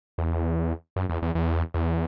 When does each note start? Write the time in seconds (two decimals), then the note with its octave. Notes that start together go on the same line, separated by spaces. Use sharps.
0.18 E2
0.96 F#2
1.09 E2
1.22 E2
1.35 E2
1.74 E2